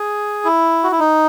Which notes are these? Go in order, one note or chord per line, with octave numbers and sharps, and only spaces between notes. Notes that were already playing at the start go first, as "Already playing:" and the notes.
Already playing: G#4
E4
F#4
E4
D#4